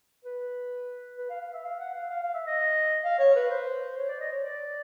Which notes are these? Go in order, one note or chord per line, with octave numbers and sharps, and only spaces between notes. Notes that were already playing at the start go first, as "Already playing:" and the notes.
B4
B4
F5
F5
E5
F5
F#5
F5
F5
F5
E5
D#5
F5
C#5
B4
C5
C#5
D5
D#5
C#5
D5